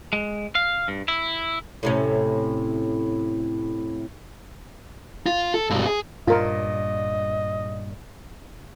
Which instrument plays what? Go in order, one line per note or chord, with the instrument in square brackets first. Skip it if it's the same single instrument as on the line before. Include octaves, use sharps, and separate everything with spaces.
[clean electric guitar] G#3
F5
G2
E4
[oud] A2 C3 C#4
[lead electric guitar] F4
A4
B1 G2
G#4
[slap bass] G2 A#2 [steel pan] F4 A#4 [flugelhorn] D#5